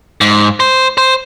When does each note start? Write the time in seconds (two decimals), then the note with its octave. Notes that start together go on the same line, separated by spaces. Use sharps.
0.21 G#2
0.60 C5
0.98 C5